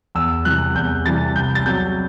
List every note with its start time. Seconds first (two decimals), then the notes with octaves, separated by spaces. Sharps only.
0.15 E2 E6
0.45 C3 E3 G3 F#6
0.75 E2 G6
1.06 C3 E3 G3 A6
1.35 C2 G6
1.55 A6
1.66 C3 F#3 G6